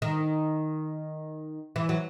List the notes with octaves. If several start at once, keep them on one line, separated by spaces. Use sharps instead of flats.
D#3
E3
F#3